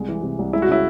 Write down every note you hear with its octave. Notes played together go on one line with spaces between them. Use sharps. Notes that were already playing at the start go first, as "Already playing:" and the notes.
Already playing: C2 G#3
E3
C3
C2
G#3 E4
F#4
C#3 E4